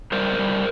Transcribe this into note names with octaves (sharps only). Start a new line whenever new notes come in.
G3 A#4 C5
G3